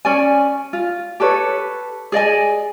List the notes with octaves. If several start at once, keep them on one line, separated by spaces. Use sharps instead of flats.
C#4 D5 G#5
F4
G4 A4 B4 C#5
G#4 D5 D#5 G#5